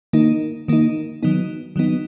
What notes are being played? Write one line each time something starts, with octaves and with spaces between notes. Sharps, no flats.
D#3 A#3 D#4
D#3 A#3 D#4
D#3 F#3 B3 D#4
D#3 F#3 B3 D#4